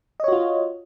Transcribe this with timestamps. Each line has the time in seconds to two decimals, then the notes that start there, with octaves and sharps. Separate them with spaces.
0.20 D#5
0.24 C#5
0.28 F#4
0.32 F4